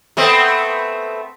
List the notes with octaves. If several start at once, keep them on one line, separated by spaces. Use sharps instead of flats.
A3 B3 C4